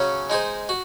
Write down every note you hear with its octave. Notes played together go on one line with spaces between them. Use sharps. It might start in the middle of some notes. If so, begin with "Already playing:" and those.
Already playing: C#3 F#3 C#4
G#3 D#4 G#4 C5
F#4